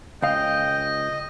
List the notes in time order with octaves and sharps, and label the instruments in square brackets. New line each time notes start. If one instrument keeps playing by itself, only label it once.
[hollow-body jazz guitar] C#2 F5 [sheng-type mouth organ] D#5 [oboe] G5